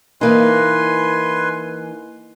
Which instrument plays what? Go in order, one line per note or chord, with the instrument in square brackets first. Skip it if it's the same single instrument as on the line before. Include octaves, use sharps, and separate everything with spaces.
[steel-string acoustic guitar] E3 A#3 D#4 [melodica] B4 G#5 C6